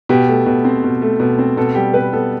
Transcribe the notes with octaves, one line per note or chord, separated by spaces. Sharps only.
B2 G4
A3
B2
C4
B2
A3
B2
C4
B2 A4
G3 G4
B2 B4
B3 A4